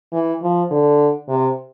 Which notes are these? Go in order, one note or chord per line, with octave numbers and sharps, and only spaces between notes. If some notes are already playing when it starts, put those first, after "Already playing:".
E3
F3
D3
C3